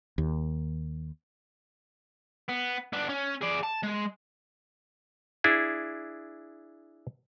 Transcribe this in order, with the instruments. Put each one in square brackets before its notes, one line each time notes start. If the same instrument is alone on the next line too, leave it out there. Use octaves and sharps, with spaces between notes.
[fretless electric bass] D#2
[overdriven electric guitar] B3
B3 D4
C#4
G#4 D5
A5
G#3
[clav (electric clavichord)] D4 E4 G#4